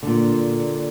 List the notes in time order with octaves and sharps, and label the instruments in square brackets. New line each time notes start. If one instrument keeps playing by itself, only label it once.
[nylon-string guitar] A#2 D3